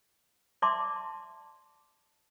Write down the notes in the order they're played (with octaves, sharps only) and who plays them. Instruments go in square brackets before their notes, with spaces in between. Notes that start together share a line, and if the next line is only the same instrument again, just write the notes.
[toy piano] D5 E5 A5 C6 D6